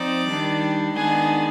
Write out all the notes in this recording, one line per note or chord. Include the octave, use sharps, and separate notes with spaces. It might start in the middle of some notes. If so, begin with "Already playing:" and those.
Already playing: F3 C4 D#4 D5
D#3 G3 D4
D#3 G#3 B3 D4 G#4